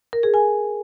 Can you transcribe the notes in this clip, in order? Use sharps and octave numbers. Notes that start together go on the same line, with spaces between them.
A#4
G#4
G#5